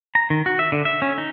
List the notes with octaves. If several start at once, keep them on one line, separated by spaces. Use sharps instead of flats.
A#5
D#3
F#4
E5
D3
E5
C#4
D#4